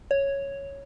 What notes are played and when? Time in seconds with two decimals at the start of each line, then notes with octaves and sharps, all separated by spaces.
0.11 C#5